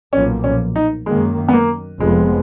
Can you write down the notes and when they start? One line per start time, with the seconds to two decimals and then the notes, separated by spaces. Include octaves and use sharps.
0.13 B1 A#2 F3 A#3 C#4
0.44 C#4
0.76 D#4
1.06 F#2 D#3 G#3 A#3
1.48 B3
1.53 A#3
1.99 F1 F2 F3 G#3 B3